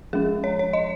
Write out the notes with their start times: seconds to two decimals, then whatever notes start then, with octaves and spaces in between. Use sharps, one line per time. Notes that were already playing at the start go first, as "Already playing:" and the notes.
0.13 F3 G#3 C#4 G#4
0.44 C#5
0.59 C#5
0.73 D#5